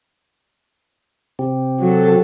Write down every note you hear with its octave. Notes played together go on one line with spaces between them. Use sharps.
C3 C4 G4
F#3 A4